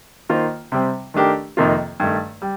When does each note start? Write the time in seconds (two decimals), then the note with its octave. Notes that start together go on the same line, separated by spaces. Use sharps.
0.29 D#3 A#3 F4 C5
0.72 C3 G3 C4
1.14 D#3 A3 D4 G4 A#4
1.57 F2 C3 D#3 A#3 F4
2.00 G2 D#3 A3
2.42 G3